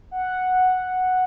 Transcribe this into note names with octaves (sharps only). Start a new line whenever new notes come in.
F#5